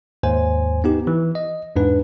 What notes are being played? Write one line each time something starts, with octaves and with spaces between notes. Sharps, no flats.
D#2 G#2 C5 G#5
B3 D#4 G4
E3
D#5
E2 G#2 D4 B4